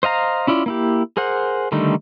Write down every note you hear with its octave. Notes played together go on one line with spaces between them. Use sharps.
C5 D#5 F5 A#5
C#4 E4 F4 D5
A#3 E4 G4
G#4 A#4 C5 F#5
D3 D#3 G3 A3 D#4